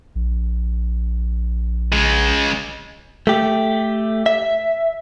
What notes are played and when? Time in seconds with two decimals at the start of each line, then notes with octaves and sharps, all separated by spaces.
0.15 A#1
1.92 C#3 G#3
3.27 A3 G4
4.26 E5